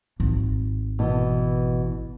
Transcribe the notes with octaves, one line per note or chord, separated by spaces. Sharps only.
G#1
B2 E3